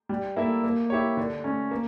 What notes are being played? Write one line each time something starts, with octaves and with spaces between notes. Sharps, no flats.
G3
A#3 E4 A4 E5
A#3
E4 G4 C#5
D3
A3 C#4
A#3